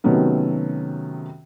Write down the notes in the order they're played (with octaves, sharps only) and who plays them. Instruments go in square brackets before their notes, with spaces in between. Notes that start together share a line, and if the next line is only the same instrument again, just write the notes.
[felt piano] C3 D#3 F#3 A3 B3 C#4